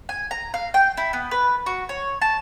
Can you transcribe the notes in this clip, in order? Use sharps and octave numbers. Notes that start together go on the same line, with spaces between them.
G#5
A#5
F5
G5
E4
B3
B4
F#4
C#5
A5